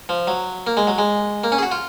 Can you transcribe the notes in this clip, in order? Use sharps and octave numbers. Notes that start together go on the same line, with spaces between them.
F3
F#3
A#3
G#3
F#3
G#3
A#3
C#4
G#4
F#4
F4